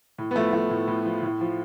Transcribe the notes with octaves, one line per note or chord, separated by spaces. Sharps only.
A2
B3
F3 A3
F3 A3
A2
A2
F3
A2
F3